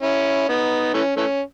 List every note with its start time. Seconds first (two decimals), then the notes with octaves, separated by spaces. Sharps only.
0.03 C#4 E4
0.49 B3 D#4
0.94 E3 A3 C#4
1.17 E3 A3 C#4